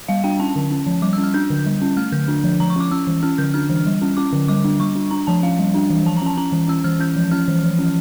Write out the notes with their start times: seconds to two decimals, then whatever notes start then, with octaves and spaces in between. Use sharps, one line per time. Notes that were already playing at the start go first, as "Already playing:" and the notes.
0.08 G3 F5
0.24 D4 G5
0.40 C#4 A5
0.56 D3
0.71 C#4
0.86 F3
1.02 G3 D6
1.13 E6
1.18 C#4
1.24 F6
1.34 D4 G6
1.50 D3
1.66 G3
1.82 C#4
1.97 A3 F6
2.12 D3 G6
2.28 D4
2.44 F3
2.60 F3 A#5
2.70 C#6
2.76 C#4 D6
2.91 C#4 E6
3.07 E3
3.23 C#4 F6
3.38 D3 G6
3.54 D4 F6
3.69 E3
3.86 G3
4.02 C#4
4.17 C#4 D6
4.33 D3
4.48 G3 D6
4.64 D4
4.80 G3 C#6
4.96 D4
5.11 D4 A#5
5.27 F3 A5
5.43 C#4 F5
5.59 G3
5.74 D4
5.90 E3
6.06 F3 A5
6.17 A#5
6.22 C#4 A5
6.38 C#4 A#5
6.52 E3
6.68 C#4 E6
6.84 E3 F6
7.00 C#4 G6
7.16 F3
7.31 C#4 F6
7.48 E3
7.63 F3
7.79 C#4